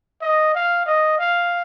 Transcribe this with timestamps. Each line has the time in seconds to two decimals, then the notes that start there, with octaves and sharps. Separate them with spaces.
0.22 D#5
0.55 F5
0.86 D#5
1.19 F5